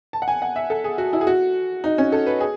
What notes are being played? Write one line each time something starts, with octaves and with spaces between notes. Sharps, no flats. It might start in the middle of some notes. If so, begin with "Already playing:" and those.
A5
F#5
G#5
F#5
E5
A4
G#4
F#4
E4
G#4
F#4
D#4
C#4
A4
B4
G#4